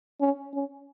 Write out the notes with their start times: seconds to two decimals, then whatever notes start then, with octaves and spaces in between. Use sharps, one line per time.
0.20 C#4
0.53 C#4